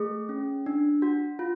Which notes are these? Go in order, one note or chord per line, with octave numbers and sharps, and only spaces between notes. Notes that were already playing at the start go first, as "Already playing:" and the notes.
Already playing: A3 G#4
C#4
D4
F#4
F4